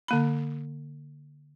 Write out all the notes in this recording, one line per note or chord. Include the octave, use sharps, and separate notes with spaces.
D3 A#3 B5